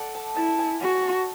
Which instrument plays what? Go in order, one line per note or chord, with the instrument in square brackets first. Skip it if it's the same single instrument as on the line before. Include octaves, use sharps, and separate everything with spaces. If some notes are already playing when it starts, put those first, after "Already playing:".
Already playing: [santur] A4 D5 F#5
A5
[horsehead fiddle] E4 [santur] A5
[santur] G#5
[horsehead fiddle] F#4 [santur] F#5
[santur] G#5
F#5
A5